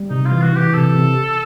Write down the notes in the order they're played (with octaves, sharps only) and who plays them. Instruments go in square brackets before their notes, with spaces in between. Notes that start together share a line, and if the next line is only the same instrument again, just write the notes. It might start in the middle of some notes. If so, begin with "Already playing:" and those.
Already playing: [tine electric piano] G3
[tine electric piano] C3 [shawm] D#4
[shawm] F4
[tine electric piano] E3
[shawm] F#4
[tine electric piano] E3
[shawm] G4
[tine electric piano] C3 [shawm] A4
[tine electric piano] C3